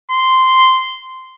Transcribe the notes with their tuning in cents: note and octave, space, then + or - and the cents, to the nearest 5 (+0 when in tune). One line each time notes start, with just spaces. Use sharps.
C6 -10